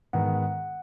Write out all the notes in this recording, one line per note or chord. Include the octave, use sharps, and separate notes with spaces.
G#2 D#3 G#3 B3 F#5